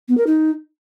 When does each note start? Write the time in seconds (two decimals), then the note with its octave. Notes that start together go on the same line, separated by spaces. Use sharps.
0.08 B3
0.17 A#4
0.27 D#4